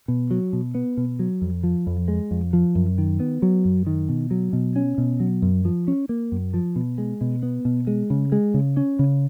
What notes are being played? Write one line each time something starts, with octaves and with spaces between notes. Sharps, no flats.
B2
F#3
B2
B3
B2
F#3
F2
F3
F2
G#3
F2
F3
F#2
D#3
B3
F#3
F#2
D#3
B2
F#3
B2
C#4
B2
F#3
F#2
F3
C#4
A#3
F#2
F3
B2
G#3
B2
B3
B2
G#3
C#3
G#3
C#3
C#4
C#3